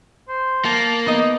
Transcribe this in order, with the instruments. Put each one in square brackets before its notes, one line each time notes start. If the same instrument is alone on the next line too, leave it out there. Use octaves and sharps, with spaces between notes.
[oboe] C5
[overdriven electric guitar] A#3 [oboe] A5
[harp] B3 D#5 [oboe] D#4